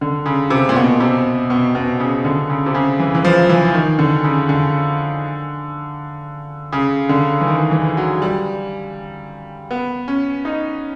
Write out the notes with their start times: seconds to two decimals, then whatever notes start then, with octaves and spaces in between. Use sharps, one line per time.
0.01 D3
0.26 C#3
0.50 C3
0.69 A#2
0.76 B2
1.00 C3
1.50 B2
1.75 B2
2.00 C#3
2.25 D3
2.50 C#3
2.66 C3
2.74 C#3
3.00 E3
3.15 E3
3.25 F3
3.49 E3
3.74 D#3
3.99 D3
4.24 C#3
4.49 D3
6.72 C#3
7.09 D3
7.41 E3
7.47 D#3
7.71 E3
7.97 F#3
8.22 G3
9.71 B3
10.08 C#4
10.45 D#4